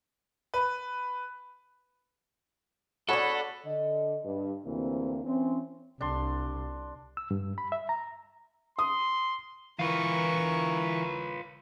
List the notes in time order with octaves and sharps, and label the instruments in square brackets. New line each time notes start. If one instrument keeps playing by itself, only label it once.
[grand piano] B4
[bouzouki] B3 D4 [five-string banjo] F#4 G#4 C#5 [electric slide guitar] A4 [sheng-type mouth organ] F#5 B5
[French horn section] D3 D#5
G2
D2 C3 E3 A#3 C4
E3 C4 C#4
[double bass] C2 [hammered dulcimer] D4 C6
[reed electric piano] E6
G2
B5
E5
A#5
[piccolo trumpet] C6 [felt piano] D#6
[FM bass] E3 [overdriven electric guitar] F4 B4 [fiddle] A#4 C#6